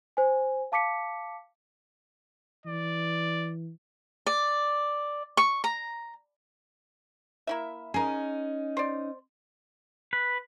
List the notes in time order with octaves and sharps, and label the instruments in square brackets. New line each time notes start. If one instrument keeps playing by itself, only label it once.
[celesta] C5 G#5
F5 A5 D6 B6 C#7
[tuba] E3 [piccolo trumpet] D5
[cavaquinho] D5
C#6
A#5
[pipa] A#3 E4 E5
[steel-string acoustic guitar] C#4 D#4 [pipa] G#4 A#4
[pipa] C5 D5
[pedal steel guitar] B4